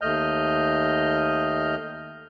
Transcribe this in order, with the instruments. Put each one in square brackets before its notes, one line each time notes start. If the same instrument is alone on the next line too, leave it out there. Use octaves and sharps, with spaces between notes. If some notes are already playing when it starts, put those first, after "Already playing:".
[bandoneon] D#2 A3 D#5 F6 G6